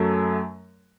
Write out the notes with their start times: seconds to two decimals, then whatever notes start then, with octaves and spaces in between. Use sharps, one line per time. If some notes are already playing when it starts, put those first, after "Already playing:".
Already playing: F#2 F#3 A3